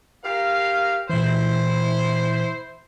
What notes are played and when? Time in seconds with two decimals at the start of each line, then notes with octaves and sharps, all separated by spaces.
0.23 G4 A#4 F5
1.10 A#2 E3 E4 C5